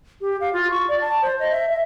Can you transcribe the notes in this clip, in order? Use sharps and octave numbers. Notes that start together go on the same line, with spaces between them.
G4
F5
F4
C#6
D5
A5
C5
D#5
E5
E5